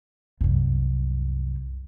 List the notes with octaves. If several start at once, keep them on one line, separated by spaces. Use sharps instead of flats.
C2 F#2